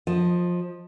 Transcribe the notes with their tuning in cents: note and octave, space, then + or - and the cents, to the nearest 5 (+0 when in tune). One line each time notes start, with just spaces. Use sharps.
F3 +15 D#5 +0